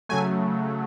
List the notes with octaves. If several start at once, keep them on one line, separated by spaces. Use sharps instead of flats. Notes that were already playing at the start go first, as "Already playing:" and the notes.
C#3 F#3 A3 G#5